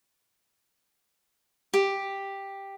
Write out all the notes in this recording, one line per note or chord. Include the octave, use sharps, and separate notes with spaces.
G4